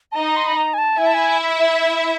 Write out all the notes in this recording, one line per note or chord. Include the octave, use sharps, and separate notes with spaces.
A5
D#4 D#5 A#5
A#5
C6
B5
A#5
G#5
A5
E4 E5 G#5
A5
G#5